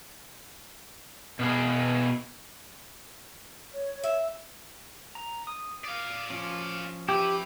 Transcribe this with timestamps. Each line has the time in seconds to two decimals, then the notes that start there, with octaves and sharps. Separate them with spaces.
1.39 B2 B3 G#4
3.72 C#5
4.03 E5
5.15 A#5
5.47 D#6
5.84 D5 F5
6.30 F3 C#4
7.09 E4 G4 B4